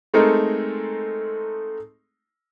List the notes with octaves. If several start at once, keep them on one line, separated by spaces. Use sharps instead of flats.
G#3 A3 C4 D#4 A4 A#4